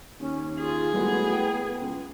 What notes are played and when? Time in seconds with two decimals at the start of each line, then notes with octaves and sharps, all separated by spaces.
0.20 D#2 C#4
0.60 F4 G#4
0.94 A2 G3 G#3 B3 F#4
1.33 G5
1.81 C#2